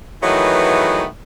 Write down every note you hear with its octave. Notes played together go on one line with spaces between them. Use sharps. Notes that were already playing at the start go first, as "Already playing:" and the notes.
D#3 E3 F#3 G#3 A3 B3